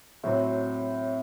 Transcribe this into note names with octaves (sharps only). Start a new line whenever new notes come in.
A2 F#3 C4 F#4